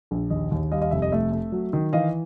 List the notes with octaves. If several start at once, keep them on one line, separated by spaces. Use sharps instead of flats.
A#1
D#2 D#5
D#2
G3 D#5 F5
D#5 F5
F1 E5
D#5
A3 E5
A3
F#3
D#3
E3 D#5 F5